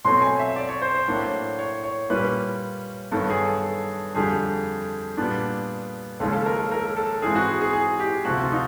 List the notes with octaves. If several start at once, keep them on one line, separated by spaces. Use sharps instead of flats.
B2 F#3 A3 C4 C6
G#5
E5
D5
C#5
C5
C5
A2 F#3 A#3 D4
C#5
C#5
A#2 G3 A#3 C#4 B4
G2 D#3 F#3 B3 A4
G#4
A4
F2 D3 G3 G#4
A#2 G3 B3 D4
D#2 C#3 F3 G#3 C#4 A4
A4
A#4
A4
A#4
A4
G#2 E3 G#3 C4 G#4
F#4
G#4
G#4
G#4
G4
D2 C3 F3 F#4
F4
D#4